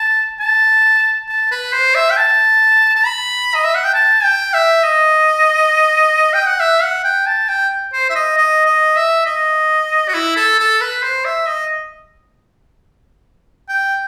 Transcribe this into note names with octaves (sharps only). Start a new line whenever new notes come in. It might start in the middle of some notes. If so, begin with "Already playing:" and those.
Already playing: A5
A5
A5
B4
C5
E5
G5
A5
A5
B5
D#5
E5
F#5
G5
A5
G5
E5
D#5
G5
F#5
E5
F#5
G5
A5
G5
C5
E5
D#5
D#5
D#5
E5
D#5
F#4
E4
A4
A4
B4
C5
E5
D#5
G5